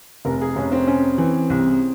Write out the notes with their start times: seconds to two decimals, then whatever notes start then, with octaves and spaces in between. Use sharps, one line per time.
0.25 F1 A#4
0.41 G#4
0.56 F1 C#4
0.72 C4
0.87 C#4
1.18 E3
1.50 C2